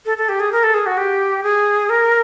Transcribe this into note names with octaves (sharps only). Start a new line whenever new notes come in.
A4
A4
G4
G#4
A#4
A4
G#4
F#4
G4
G#4
A#4